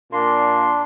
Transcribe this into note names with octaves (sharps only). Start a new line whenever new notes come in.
A#2 A#3 D4 C6